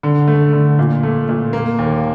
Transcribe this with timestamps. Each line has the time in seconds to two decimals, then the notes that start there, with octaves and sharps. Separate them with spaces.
0.03 D3
0.28 A3
0.53 D3
0.79 A#2
1.03 A3
1.29 A#2
1.53 A#3
1.79 D#2